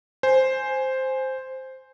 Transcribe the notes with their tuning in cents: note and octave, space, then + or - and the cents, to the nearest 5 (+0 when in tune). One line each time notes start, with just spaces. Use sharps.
C5 +0 G#5 +0